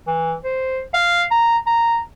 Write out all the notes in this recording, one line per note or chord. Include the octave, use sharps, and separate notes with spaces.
E3
C5
F5
A#5
A#5